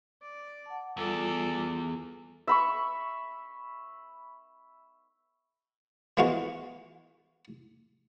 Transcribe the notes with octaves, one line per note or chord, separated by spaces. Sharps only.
D5
F#5 A5
E2 G3 F4 A4 D5 D6
E5 B5 C#6
E3 F3 G#3 B3 F4 F#4